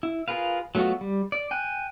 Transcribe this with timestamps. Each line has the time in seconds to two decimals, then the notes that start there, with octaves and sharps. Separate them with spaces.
0.03 E4
0.28 F4 G#4 A#4 B4 F5
0.75 F#3 A3 B3 F4 F#4
1.01 G3
1.32 D5
1.51 G5 G#5 F#6